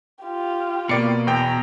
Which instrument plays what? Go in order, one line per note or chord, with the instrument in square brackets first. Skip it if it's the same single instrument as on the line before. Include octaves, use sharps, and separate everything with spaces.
[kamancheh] F4 G4
[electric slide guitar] B2 [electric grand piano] A#3 D5 C#7
[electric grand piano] E2 G5 [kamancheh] A#5